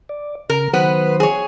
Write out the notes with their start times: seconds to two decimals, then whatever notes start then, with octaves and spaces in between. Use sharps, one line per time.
0.09 D5
0.50 C#3 A#4
0.73 D#3 F#3 B3 B4 C5
1.20 G#4 C#5